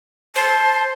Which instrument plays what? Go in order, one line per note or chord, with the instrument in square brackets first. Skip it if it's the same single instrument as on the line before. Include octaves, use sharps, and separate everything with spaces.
[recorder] C5 [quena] A5